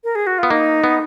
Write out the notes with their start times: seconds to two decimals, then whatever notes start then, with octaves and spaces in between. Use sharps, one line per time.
0.04 A#4
0.15 G#4
0.27 F#4
0.39 B3 F4
0.50 A#3 D#4
0.84 B3